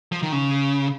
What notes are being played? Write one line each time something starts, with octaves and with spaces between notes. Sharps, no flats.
F3
D#3
C#3